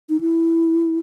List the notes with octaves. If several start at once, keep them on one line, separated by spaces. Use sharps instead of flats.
D#4
E4